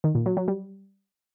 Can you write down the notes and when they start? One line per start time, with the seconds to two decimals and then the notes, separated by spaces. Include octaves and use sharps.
0.04 D#3
0.15 A#2
0.26 F#3
0.37 F#3
0.48 G3